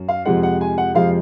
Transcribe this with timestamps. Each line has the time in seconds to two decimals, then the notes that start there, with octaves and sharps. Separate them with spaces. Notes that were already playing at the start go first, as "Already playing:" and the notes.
Already playing: F#2
0.08 F5
0.25 F2 C3 F3 G#3 F#5
0.43 F#5
0.61 G#5
0.78 F#5
0.94 F2 C3 F3 G#3 F5